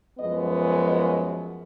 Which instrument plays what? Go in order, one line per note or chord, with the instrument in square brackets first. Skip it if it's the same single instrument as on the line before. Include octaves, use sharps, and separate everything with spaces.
[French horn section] F#2 F3 G#3 B3 D#5
D#5